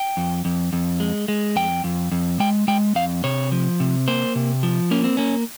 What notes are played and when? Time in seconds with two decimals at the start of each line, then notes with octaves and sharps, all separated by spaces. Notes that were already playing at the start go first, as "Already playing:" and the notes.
Already playing: G5
0.17 F2
0.45 F2
0.73 F2
1.00 G#3
1.28 G#3
1.56 F2 G5
1.84 F2
2.12 F2
2.40 G#3 G5
2.68 G#3 G5
2.95 F2 F5
3.24 C3 C#5
3.52 F3
3.80 C3
4.08 A#3 C5
4.35 C3
4.63 F3
4.91 A#3 C#4
5.04 C4
5.17 A#3 C#4